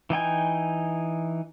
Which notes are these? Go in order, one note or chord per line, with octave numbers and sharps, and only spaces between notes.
E3 D#4 G5 G#5